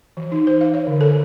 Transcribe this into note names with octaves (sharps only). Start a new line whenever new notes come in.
E3
D#4
C5
F5
C#5
D3
A4